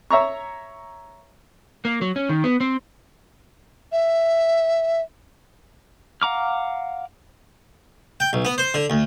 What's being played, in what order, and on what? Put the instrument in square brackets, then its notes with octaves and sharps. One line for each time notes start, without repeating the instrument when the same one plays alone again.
[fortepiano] C#5 E5 A#5 C#6
[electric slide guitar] A#3
F#3
C#4
D#3
B3
C4
[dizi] E5
[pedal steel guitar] F5 F#5 A#5 D6 F6
[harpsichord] G5
B1
B3
C5
D3
D2